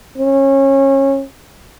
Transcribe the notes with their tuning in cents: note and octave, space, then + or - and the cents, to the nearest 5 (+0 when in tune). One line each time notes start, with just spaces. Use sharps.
C#4 -25